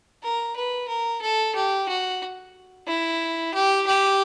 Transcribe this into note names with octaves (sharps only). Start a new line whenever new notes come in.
A#4
B4
A#4
A4
G4
F#4
E4
G4
G4